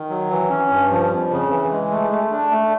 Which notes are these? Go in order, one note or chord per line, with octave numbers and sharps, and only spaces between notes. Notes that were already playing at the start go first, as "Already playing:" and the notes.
Already playing: D#3
F#3
E3
C#4
G2
F3
F2
C#3
E3
G#3
A3
A3
D4
A3